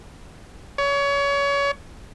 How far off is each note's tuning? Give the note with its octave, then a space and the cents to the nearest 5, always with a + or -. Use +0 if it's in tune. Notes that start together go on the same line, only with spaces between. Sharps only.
C#5 +25